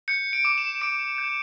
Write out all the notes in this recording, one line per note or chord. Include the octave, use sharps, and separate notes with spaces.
G6 C#7
D7
D6
E7
D6 D7
G6